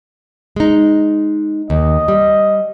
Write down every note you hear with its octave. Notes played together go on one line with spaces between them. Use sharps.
G#3 D#4
D#2 D#5
G3